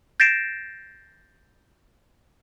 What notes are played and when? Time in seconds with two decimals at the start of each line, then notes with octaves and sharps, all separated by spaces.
0.20 G6 A6 A#6 C7 D7 E7